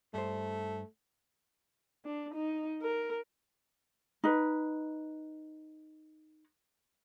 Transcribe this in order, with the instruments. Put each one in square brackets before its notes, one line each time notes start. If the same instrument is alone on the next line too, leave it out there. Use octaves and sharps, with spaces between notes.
[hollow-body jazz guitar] G2 C5 [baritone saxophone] A3
[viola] D4
D#4
A#4
[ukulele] D#4 B4